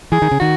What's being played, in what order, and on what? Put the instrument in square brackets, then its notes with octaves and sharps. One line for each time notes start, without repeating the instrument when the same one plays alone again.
[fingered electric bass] E3 [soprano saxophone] G#4
[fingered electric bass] D#3
C#3
[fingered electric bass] D#3 [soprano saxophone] F#4